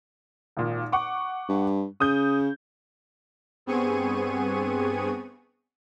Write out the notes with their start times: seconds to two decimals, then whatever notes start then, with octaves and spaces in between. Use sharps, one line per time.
0.57 G#1 A#2
0.92 F#5 C#6 D6
1.49 G2
2.00 C#3 D#6 G6
3.66 G2 B3 C4 G#4 C#6 D#7